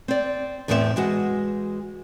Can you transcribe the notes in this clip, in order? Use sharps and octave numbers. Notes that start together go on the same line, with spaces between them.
C4 D5
E2 A2 B3 C4 D5 E5
E3 G#3 F#4